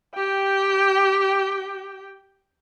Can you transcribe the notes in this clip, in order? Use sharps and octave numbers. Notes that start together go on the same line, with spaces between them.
G4 G5